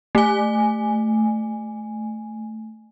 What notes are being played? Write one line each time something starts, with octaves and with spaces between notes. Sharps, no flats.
A3 G#5